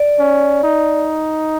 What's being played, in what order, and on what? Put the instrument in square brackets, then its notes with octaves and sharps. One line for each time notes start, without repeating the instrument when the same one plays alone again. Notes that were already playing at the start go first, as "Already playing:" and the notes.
Already playing: [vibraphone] D5
[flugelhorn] C#4
D#4